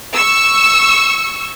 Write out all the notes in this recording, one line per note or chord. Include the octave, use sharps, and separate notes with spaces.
C#6 E6